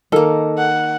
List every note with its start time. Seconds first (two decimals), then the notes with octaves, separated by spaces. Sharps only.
0.12 D#3 A#3 A4 A#4
0.58 F#5